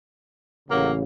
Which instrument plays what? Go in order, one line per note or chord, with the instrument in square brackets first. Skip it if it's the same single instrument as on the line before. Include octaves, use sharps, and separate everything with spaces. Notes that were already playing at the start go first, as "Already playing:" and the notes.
[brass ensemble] A1 C#3 [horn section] F#3 A#3